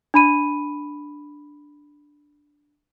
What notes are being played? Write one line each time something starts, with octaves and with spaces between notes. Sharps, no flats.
D4 B5 D#7